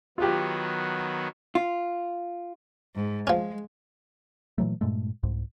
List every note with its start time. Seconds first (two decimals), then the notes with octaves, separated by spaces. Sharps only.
0.18 D#3 F#3 B3 F4 G4
1.55 F4
2.95 G#2
3.27 F3 G#3 C#4
4.58 A#2 E3 F#3 A3
4.81 G2 A#2 G#3 A3
5.23 C2 G#2